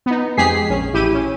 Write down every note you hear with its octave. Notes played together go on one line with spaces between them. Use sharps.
B3 D#4
F2 G#3 G4 G#4 B6 C7
A#1 C#4
A1 E4 G4 D#7
C#4